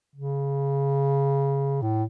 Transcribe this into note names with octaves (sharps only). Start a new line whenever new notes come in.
C#3
A2